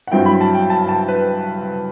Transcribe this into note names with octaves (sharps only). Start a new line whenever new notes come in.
F#5
G2 F#3 C4 E4 G5
B5
A5
G5
A5
A5
B4